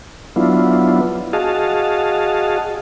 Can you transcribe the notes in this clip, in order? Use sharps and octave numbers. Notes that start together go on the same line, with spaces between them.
F#3 B3 D4 E4 F4
F#4 G#4 D#5 F5 A5